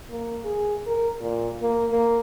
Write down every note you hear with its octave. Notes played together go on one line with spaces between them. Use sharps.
A#3
G#4
A#4
A#2
A#3
A#3